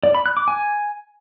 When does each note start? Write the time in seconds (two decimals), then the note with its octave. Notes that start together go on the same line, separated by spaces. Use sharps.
0.04 D5
0.15 B5
0.26 F#6
0.37 D6
0.48 G#5